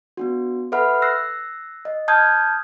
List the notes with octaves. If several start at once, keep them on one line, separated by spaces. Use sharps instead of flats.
B3 D4 F#4
A4 B4 E5 F#5 B5 F6
E6 F#6 A#6 C7
D#5
A5 D#6 F6 G6 G#6